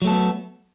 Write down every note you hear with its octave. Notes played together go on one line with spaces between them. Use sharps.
F#3 A3 B3 A4